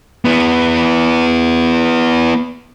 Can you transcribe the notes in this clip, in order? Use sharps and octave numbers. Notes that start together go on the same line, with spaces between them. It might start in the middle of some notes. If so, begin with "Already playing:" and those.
B3 E4